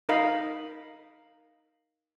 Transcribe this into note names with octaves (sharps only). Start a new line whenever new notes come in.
D#4 A#4 D#5 F5 B5